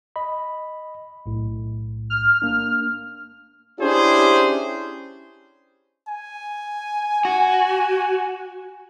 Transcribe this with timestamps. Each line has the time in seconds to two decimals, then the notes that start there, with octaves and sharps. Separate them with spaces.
0.16 D#5 B5
1.26 B1 A2
2.10 F6
2.42 A#3 D4
3.80 C#4 D4 E4 G4 G#4 C5
6.08 G#5
7.25 F#4